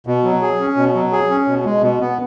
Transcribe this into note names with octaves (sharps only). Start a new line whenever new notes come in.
B2
F#3
G#4
C#4
B2
F#3
G#4
C#4
B2
G#3
B2
B3